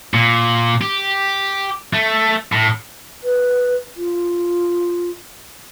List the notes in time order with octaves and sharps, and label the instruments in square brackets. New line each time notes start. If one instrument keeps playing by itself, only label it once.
[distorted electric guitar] A#2
G4
A3
A2
[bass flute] B4
F4